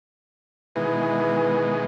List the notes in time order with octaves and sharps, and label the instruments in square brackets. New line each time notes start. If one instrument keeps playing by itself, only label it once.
[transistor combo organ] B2 D#3 G#3 [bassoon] E3